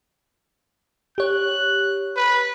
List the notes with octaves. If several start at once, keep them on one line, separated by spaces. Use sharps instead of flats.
G4 C#5 F#6
B4